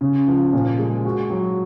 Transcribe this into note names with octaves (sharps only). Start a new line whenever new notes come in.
C#3
F3
A#2
G#3
F#4
F#3